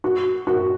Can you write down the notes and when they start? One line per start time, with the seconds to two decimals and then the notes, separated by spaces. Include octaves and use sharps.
0.04 F#4
0.47 F#4